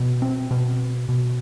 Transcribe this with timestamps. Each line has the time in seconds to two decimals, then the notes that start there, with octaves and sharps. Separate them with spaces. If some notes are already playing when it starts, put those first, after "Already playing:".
Already playing: B2
0.22 C4
0.51 B2
1.09 B2